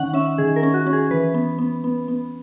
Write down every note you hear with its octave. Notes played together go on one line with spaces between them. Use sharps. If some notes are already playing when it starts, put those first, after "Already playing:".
Already playing: D#3 C#4 F#5
C#4 E5
D#3 G#4
A#4
C#4
F#4
C#4
G#4
E3 B4
B3
B3
B3
B3